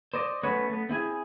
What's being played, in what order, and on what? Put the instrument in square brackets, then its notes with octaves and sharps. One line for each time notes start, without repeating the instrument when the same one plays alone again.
[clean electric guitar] C5 D5 D#5
A3 B3 C#4 F#4 B4 C#5
A3 B3
C4 E4 G#4 G#5